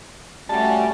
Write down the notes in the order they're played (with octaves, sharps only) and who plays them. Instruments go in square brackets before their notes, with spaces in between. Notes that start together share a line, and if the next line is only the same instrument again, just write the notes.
[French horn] G3 [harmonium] A3 C#4 F#4 [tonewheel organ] A5